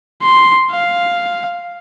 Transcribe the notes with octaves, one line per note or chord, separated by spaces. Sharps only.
C6
F5